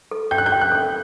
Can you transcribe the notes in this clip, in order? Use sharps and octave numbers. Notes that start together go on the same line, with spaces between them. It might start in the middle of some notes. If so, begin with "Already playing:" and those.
A4
G5 G6
F#6
G6
G5
F#6
A4